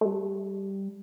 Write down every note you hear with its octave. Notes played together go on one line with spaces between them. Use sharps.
A3
G3